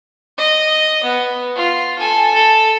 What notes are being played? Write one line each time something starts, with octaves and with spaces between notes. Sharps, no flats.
D#5
B3
F4
A4 G#5
A4